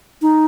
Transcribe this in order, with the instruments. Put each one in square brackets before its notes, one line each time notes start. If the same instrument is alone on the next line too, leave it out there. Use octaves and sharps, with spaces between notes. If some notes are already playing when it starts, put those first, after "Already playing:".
[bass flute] D#4